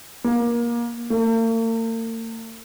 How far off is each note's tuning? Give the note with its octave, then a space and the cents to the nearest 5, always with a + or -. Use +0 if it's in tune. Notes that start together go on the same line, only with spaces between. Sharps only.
A#3 +25
A#3 -45